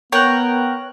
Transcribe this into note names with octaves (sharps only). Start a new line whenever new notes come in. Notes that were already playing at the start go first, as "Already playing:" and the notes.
B3 A#4 C#5 G5 F#6